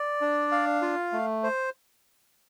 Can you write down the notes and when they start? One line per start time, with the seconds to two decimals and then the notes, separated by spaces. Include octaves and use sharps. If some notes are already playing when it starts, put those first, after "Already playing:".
Already playing: D5
0.21 D4
0.52 F5
0.82 F4
1.13 A3
1.44 C5